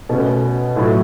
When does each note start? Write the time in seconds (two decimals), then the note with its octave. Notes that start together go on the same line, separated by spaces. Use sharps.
0.09 B2 A3 C#4
0.76 A2 F#3 A3 E4